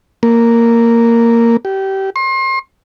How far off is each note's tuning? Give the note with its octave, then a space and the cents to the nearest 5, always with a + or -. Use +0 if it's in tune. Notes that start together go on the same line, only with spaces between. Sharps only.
A#3 -5
G4 -25
C6 +35